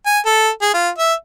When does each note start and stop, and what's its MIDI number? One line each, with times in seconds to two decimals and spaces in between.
0.06 0.19 80
0.26 0.49 69
0.62 0.70 68
0.74 0.89 65
0.99 1.14 76